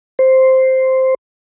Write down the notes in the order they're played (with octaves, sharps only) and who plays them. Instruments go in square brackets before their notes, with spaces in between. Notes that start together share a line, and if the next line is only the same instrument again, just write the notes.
[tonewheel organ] C5